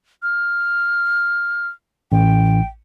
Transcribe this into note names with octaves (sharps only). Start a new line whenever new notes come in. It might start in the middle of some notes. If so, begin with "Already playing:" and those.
F6
A1 G5